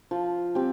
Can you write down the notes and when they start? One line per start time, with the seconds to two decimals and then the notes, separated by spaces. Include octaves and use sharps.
0.11 F3
0.55 C4 G4